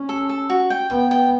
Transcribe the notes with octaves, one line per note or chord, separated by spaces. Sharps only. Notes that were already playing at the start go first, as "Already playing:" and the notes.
Already playing: C#4
A4
A4
F#4
G5
B3 G5
G5